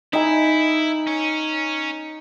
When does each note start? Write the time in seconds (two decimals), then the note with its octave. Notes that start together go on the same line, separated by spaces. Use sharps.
0.13 D#4 E4 G#5
1.07 C#4